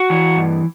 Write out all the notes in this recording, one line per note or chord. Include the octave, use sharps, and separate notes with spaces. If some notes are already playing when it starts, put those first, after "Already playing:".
Already playing: F#4
E3
G2